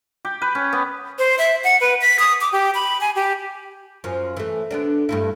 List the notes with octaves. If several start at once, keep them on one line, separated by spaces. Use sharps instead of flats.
G4
B4
C#4
B3
C5
E5
F#5
B4
B6
D#6
D6
G4
B5
G#5
G4
F#2 F3
E3 A3
D3 B3 D4
G2 A3 E4